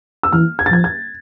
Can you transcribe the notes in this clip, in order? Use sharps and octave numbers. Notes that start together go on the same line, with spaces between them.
E6
E3 F6
G#6
A6
F3 G#6
G#6